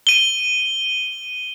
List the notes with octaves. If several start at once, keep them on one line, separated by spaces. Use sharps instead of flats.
D#7 G7